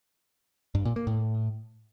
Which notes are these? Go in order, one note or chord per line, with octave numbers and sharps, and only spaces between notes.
G2
A#2
A#3
A2